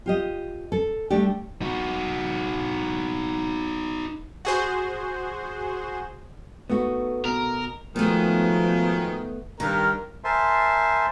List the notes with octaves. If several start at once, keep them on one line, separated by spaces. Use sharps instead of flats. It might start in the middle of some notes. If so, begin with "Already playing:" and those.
F4 G4 D#5
A4
G3 A3 D4 G4
D#4 F#4
F#4 G#4 C5
A3 B3 D#4 F#4
B2 A#4
G#2 B2 D#3 F3 A3 B3
G2 D#3 A#4
A#4 C5 E5 G#5 A5 C6